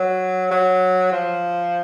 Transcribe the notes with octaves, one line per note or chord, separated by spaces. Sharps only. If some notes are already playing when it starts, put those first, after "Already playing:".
Already playing: F#3
F#3
F3